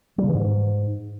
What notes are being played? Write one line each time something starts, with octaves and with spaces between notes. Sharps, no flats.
G3
C#3
E3
G#2